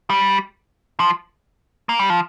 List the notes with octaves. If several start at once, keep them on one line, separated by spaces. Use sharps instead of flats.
G3
F3
A#3
G3
F3